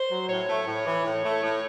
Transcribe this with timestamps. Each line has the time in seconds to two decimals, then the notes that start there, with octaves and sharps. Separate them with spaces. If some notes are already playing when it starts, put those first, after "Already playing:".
Already playing: C5
0.10 F#3
0.28 A2 C#5
0.47 A3
0.66 A2
0.86 E3
1.04 A2
1.23 A3
1.42 A2